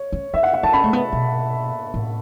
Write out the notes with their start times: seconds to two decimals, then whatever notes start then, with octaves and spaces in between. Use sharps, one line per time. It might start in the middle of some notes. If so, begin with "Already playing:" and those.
Already playing: C#5
0.12 C#4
0.34 E4 E5
0.43 F#5
0.53 F#5
0.63 E4 A5
0.73 C#4 B5
0.84 A3
0.93 B3
1.13 B2
1.94 A2